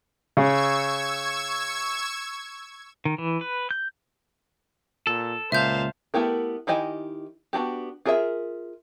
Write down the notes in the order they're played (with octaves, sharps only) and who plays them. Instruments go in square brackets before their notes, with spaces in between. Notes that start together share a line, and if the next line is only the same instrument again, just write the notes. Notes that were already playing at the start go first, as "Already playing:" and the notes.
[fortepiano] C#3 [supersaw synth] C#6 E6 G#6
[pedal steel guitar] D#3
E3
B4
G6
[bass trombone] A#2 [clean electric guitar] A4
[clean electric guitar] C#2 [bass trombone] A#2 [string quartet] C5 F5 A5 [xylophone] E5 G6
[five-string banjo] A3 B3 E4 G4 A#4
D#3 E4 G4 D#5 G#5
B3 D4 F#4 G4
F4 G#4 A#4 D5 E5